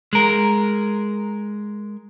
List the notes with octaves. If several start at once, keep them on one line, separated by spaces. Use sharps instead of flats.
G#3 A#4